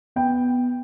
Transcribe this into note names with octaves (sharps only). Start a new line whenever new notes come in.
B3 G5